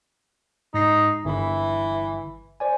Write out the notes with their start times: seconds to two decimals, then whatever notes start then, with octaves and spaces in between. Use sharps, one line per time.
0.74 G#2 D#4 A#6 C7
1.25 G1 E3 B5
2.60 C5 D5 G#5